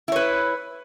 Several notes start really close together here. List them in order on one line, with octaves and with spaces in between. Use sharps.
E4 C#5 B4